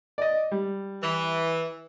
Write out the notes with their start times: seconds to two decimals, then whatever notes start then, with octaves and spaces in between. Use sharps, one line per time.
0.18 D5 D#5
0.52 G3
1.03 E3